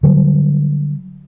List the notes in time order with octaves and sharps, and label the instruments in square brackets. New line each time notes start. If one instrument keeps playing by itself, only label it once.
[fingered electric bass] D3 F#3 G3